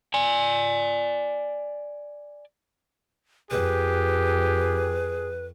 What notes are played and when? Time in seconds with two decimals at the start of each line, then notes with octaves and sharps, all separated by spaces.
0.14 D5 G#5
3.51 F2 G4 G#4 B4